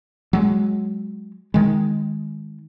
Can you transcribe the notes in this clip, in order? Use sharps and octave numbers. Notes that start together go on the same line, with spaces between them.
F#3 G#3
D#3 G#3